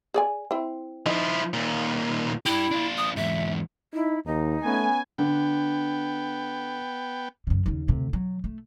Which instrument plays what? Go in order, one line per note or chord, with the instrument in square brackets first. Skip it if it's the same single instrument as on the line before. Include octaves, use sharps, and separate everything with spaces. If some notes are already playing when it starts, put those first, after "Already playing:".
[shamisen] G#4 D5 G#5
C4 E4
[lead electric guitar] F3 E4 [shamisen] D#4
[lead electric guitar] D#2 A#2
[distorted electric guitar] D4 G4 [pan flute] E4
[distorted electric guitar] D4 F4
[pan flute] D#6
[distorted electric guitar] E2 G#2 [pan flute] E5
[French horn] D#4 [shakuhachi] E4
[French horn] D#2 [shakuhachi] D#4
[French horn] A3 [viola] B3 C#4 [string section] G#5
[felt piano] D3 D4 [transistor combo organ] B3 G5
[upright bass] F#2 C#3
D#2 C#3
D2 C3
F#3
A3